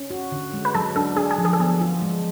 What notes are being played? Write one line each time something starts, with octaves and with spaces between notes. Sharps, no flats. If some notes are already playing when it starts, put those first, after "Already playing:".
Already playing: C#4
F#4
D3
G#3
B4
F#3 A4
D4 A4
D4 G#4
G#4
F3
G#4
A4
B3 G#4
F4
G#3